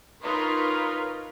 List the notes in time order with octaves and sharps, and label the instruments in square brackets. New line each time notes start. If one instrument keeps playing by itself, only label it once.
[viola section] D#4 F4 A#4 B4 C#5 C6